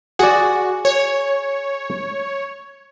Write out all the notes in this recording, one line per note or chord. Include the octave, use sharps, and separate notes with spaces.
F#4 G#4 D5
C#5